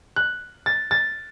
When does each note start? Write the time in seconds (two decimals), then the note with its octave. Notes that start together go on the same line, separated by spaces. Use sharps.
0.16 F#6
0.66 A6
0.91 A6